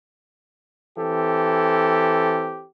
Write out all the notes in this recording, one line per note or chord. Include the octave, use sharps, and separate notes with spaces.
E3 C4 G4 A4